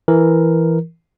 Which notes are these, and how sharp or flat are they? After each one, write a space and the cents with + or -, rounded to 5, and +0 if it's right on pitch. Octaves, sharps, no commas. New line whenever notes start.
E3 +5 A#4 +0